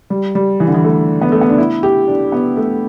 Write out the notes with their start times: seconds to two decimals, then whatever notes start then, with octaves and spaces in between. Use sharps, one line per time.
0.10 G3
0.35 G3
0.60 E3
0.68 D3
0.74 E3
0.84 A3
1.22 B3
1.32 A3
1.41 B3
1.49 D4
1.58 E4
1.83 G4
2.08 D4
2.32 B3
2.57 A3